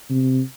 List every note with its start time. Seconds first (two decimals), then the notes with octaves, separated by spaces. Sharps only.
0.10 C3